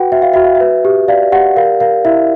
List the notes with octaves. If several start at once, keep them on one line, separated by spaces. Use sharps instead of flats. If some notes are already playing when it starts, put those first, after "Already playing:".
Already playing: F#4 B4 F#5 G5
F#4 E5
F5
F#4 E5
F5
E5
B4
G4
D5 F5
G4 F#5
A#4 F5
A#4 F5
E4 E5